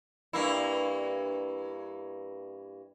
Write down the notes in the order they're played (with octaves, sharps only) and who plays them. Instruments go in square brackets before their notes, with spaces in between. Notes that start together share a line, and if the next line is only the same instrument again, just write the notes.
[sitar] G2 A#3 E4